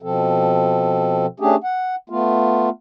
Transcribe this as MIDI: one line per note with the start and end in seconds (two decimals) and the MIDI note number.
0.02 1.26 47
0.02 1.26 53
0.02 1.26 60
0.02 1.26 69
1.40 1.56 57
1.40 1.56 61
1.40 1.56 62
1.40 1.56 67
1.40 1.56 68
1.64 1.95 78
2.10 2.69 57
2.10 2.69 59
2.10 2.69 65